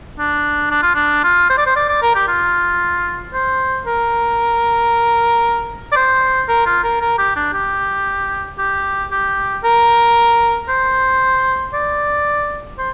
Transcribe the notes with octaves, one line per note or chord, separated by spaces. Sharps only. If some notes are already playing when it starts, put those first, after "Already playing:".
D4
D4
F4
D4
F4
C5
D5
C5
D5
D5
A#4
G4
F4
C5
A#4
D5
C5
A#4
F4
A#4
A#4
G4
D4
G4
G4
G4
A#4
C5
D5
C5